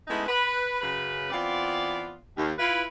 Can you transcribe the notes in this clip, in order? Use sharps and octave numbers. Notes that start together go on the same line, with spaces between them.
G#3 A3 B3 C#4 D#4 E4
B4
F#2 C#3 B4
E3 B3 C4 F4 D5
D#2
E4 F4 B4